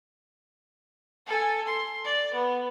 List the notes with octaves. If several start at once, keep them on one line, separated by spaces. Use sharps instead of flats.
A4 G#5
C6
D5
B3